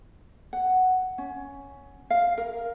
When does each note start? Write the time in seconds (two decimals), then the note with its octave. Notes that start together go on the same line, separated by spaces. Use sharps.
0.53 F#5
1.18 C#4
2.10 F5
2.38 A#4